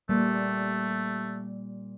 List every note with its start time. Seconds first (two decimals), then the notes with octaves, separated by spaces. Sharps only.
0.09 A#2 G3 A3